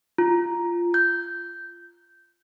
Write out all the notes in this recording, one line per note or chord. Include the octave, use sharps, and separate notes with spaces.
F4
G6